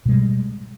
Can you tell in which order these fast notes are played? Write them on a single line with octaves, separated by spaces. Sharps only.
B2 G#3 G3